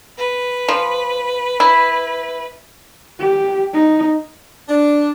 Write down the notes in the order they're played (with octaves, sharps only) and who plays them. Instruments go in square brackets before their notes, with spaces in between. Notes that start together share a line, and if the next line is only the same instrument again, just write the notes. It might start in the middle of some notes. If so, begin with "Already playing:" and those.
[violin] B4
[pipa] F3
E4
[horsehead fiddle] G4
D#4
[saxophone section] D4